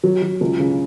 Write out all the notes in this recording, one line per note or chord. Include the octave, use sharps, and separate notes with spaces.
F#3
F#3
C#2
C#3